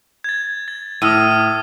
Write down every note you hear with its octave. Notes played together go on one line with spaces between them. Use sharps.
G#6 A6
A6
A2 D#6 F6 D#7